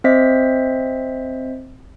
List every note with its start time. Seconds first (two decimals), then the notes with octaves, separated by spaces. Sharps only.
0.04 C4 C5 D#5 E5 B6